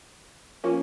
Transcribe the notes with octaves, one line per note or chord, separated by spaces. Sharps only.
F3 A#3 C#4